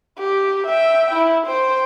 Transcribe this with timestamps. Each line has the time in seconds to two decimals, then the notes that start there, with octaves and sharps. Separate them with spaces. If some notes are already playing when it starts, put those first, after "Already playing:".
0.19 G4
0.67 E5 G5
1.14 E4
1.47 C5 G5